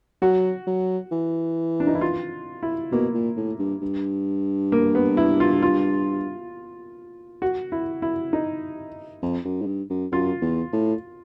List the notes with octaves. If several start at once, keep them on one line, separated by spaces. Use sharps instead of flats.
F#3 F#4
F#3
E3
D4
D#4
E4
F4
E4
B2 A#3
A#2
A2
G2
G2
A#3
B3
E4
F4
F4
F#4
E4
E4
D#4
F2
F#2
G#2
G2
F#2
F#2 F4
E2
A2